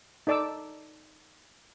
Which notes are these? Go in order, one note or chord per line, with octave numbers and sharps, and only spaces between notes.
D#4 A4 D5 A5 D6 E6